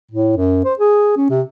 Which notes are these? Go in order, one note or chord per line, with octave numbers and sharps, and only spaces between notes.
A2
F#2
C5
G#4
C#4
C3